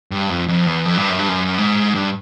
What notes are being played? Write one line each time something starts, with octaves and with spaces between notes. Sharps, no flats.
G2
F2
F2
E2
F2
G2
F#2
G2
F#2
G#2
G2